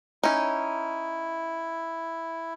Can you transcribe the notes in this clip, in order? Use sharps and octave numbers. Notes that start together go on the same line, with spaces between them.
C#4 D#4 E4